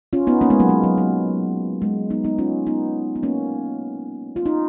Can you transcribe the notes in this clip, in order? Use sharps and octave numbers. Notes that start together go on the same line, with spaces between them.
C#4 F4
B3 D#4
A#3 C#4
G#3 B3
F#3 A#3
G#3
F#3
F#3
G#3
B3 D#4
B3 D#4
C#4 F4
B3 D#4
B3
A#3 C#4
F4
D#4